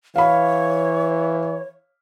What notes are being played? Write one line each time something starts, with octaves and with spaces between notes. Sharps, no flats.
E3 C#5 F5 B5